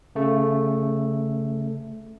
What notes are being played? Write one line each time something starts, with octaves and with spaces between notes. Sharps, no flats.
C#3 A3